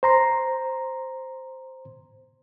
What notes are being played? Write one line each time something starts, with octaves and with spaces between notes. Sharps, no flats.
C5 A#5 C6